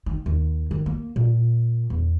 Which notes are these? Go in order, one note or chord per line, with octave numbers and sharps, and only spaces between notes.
D#3
D#2
D#3
A#3
A#2
E2